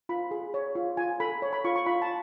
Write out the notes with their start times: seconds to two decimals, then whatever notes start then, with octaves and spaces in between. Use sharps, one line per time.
0.09 F4 B5
0.31 G#4
0.54 C#5
0.75 F4
0.97 F4 G#5
1.20 A4 B5
1.42 C#5
1.53 B5
1.64 F4 C#6
1.76 C#6
1.86 F4 B5
2.02 A5